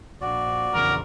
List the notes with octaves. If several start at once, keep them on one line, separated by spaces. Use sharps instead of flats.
A#1 F#4 D5
A#1 E2 C#3 A#4